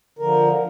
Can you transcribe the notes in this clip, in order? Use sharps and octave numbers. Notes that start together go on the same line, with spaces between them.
D3 F3 A#4